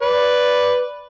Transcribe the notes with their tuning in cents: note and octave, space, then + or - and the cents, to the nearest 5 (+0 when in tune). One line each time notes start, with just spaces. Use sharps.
B4 +0 D5 -5